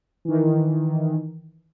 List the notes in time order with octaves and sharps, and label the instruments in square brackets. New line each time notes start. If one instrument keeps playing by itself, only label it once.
[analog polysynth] D#3 E3